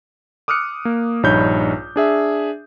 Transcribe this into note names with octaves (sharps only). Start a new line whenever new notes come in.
D6 D#6 F6 F#6 C#7
A#3
A#1 G2 D#4 C#5 B5 G6
D4 G#4 E5